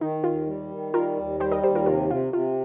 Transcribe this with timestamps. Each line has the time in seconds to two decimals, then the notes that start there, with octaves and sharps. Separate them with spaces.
0.01 D#3 D#4
0.24 D#2 F4
0.47 G3
0.71 D#3
0.93 G3 F4 A#4
1.16 D#2
1.40 G3 G4 C5
1.51 A#4 D#5
1.63 D#2 G4 C5
1.75 F4 A#4
1.86 C3 F4 A#4
2.09 C3 F4
2.33 C3 F4